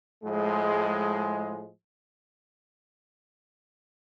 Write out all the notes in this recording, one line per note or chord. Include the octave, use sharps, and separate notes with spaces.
A2 F3 G#3